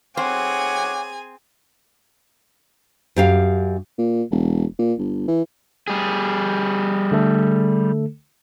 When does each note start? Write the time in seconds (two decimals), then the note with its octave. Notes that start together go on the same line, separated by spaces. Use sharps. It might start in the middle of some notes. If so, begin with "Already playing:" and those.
0.17 C4 G#4 C#5 F#5 G#5 D6
3.16 F#2 G4 F5
3.98 A#2
4.31 E1
4.79 A#2
4.99 G1
5.28 E3
5.88 G3 G#4
7.12 D3 A3 A4